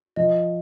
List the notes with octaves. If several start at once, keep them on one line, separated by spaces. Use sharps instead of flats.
F3 D#5